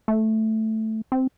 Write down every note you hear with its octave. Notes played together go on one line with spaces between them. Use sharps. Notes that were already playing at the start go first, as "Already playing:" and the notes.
A3
C4